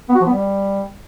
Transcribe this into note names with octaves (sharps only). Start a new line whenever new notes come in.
B3
F#4
F3
B3
G3